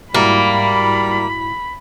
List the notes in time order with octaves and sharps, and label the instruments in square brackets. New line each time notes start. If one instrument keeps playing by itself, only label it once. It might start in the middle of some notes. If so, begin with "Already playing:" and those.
[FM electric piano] G#2 E4 F#4 [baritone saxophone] G3 [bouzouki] A#3 [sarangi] B5